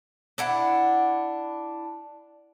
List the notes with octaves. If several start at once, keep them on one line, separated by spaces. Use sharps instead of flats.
D4 E4 F#5